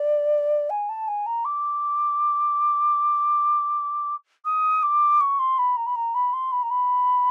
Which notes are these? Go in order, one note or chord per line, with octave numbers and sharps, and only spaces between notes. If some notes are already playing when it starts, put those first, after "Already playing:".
Already playing: D5
G#5
A5
G#5
A#5
D6
D#6
D6
C#6
C6
B5
A#5
B5
A#5
B5
C6
B5
A#5
B5